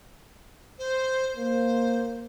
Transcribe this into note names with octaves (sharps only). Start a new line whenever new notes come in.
C5
A#3 C5